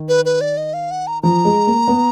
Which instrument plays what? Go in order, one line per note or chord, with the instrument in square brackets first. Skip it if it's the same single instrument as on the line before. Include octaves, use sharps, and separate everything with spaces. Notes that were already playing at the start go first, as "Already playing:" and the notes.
Already playing: [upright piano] D#3
[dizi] B4
B4
D5
D#5
F5
F#5
A#5
[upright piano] F3 [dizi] A#5
[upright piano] G#3
A#3
B3